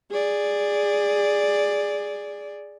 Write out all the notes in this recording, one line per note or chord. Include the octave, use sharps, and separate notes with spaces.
G#4 D5